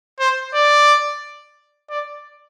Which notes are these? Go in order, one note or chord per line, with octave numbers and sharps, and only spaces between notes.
C5
D5
D5